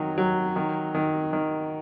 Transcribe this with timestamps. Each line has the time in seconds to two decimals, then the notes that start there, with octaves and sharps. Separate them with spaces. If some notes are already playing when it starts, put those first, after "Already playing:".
Already playing: D#3 F#3
0.18 F#3
0.56 D#3
0.94 D#3
1.33 D#3